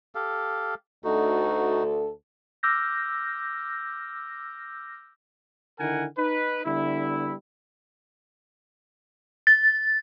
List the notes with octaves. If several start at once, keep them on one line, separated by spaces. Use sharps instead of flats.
G4 A4 F5
D2 D#4 F#4 A4
D6 E6 F6 G6 A#6
D3 D#3 E4 A#4 F#5 G#5
D#4 B4
D3 G3 B3 E4
A6